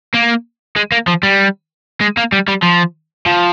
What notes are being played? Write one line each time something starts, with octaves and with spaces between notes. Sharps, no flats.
A#3
G#3
A#3
F3
G3
G#3
A#3
G3
G3
F3
F3